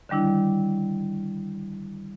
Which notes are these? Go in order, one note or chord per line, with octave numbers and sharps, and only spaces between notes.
D3 D#3 G3 D4 E4